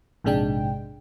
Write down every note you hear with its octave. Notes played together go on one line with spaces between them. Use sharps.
A#1 G#2 C3 G#3 D4 G5